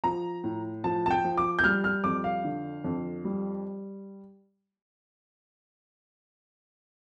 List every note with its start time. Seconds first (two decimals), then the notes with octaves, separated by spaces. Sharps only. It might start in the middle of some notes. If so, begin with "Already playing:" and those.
0.04 F3 A#5
0.44 A2
0.84 F3 A5
1.06 A5
1.10 G5
1.24 F3
1.37 D6
1.59 G6
1.64 G3 F6
1.84 F6
2.04 F2 D6
2.24 F5
2.44 D3
2.84 F2
3.24 G3